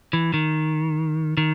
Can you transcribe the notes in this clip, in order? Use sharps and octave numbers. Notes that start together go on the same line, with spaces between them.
E3
D#3
D#3